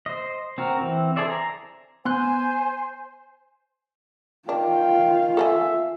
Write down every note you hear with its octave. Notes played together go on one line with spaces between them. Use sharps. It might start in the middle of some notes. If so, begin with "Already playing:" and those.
C5 D#5
C4 F#4 A#4
E3 C4
G#4 A4 C5 D5 E5
A#5
B3 C5 G#5 C6 F#6
D#3 D4 F4 F5 G5
A4 E5 F#5 G#5